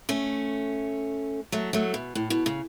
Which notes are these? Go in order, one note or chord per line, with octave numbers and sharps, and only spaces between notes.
A3 C#4
F#3 A3
F#3 A3
B2
A2
B2
C#3